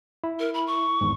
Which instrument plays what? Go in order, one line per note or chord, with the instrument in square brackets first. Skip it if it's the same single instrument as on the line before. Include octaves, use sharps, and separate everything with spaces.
[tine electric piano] E4
[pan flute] A#4
B5
C#6
[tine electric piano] G#1 E2 G#2